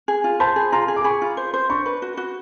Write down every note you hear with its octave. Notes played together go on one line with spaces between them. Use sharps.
G#4
F4
C5 A5 B5
G#4
F4 A#5 C6
G#4
D6
G#4 B5 C#6
F4
C5
C5
D4 B5 C#6
B4
F#4
F#4